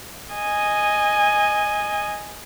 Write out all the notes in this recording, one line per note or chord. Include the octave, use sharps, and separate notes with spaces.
D#5 G#5